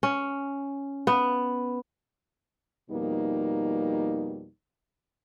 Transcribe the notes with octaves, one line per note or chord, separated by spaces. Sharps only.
C#4
B3
F2 B2 G3 A#3 D#4